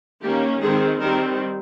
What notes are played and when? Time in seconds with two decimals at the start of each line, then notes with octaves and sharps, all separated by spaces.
0.22 D#3 A#3 C#4 G4
0.61 D#3 G#3 C4 G#4
1.00 D#3 G3 C4 A#4